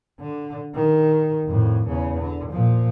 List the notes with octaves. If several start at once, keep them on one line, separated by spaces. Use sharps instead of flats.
D3
D#3
F2 A2
E2 C#3
D3
A#2 F3